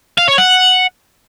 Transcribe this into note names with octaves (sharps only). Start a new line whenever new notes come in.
F5
C#5
F#5